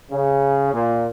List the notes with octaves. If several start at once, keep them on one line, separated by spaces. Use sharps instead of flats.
C#3
A#2